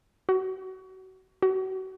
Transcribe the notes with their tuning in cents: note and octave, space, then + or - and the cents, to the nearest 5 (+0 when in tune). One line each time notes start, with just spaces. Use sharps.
F#4 +30
F#4 +35